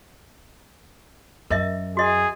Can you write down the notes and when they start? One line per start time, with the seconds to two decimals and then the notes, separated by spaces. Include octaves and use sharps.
1.50 F#2 A#4 D#5 E5
1.97 F#4 G#4 D#5